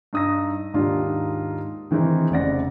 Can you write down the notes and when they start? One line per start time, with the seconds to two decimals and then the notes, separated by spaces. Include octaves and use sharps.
0.13 G2 D#4 D#6 E6 A#6
0.74 D#2 G#2 D4 D#4 F4 G4
1.91 D#3 E3 G#3 C4 D#4
2.31 F1 C#3 C4 D5 F#5 A#6